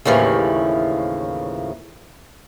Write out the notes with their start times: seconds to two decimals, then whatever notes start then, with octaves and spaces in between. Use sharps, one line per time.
0.05 D#2 A2 C#3 E3 F3